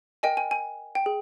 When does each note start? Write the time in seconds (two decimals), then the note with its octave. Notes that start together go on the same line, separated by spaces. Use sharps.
0.23 A#4 D#5 G5 G#5
0.37 G#5
0.51 G#5
0.95 G5
1.06 G#4